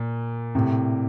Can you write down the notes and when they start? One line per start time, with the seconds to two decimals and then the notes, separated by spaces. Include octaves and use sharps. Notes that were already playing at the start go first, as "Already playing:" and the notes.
Already playing: A#2
0.55 A2 C3